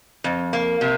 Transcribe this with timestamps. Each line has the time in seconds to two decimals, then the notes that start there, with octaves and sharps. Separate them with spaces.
0.24 F2
0.53 A#3
0.81 C3